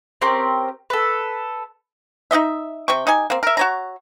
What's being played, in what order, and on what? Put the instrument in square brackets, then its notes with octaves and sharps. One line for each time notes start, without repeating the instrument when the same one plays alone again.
[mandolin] C4 C#4 G4 A#4
A4 B4
[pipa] D#4 F4 D#5 E5
C3 G5 C#6
D#4 G4 G#5
A#3 C4
A#4 E5
F#4 C#5 A#5